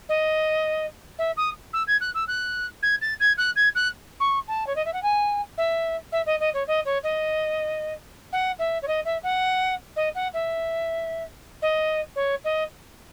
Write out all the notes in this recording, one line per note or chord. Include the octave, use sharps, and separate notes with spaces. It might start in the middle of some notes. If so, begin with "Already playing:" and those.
D#5
E5
D#6
E6
G#6
F#6
E6
F#6
G#6
A6
G#6
F#6
G#6
F#6
C#6
A5
C#5
D#5
E5
F#5
G#5
E5
E5
D#5
D#5
C#5
D#5
C#5
D#5
F#5
E5
C#5
D#5
E5
F#5
D#5
F#5
E5
D#5
C#5
D#5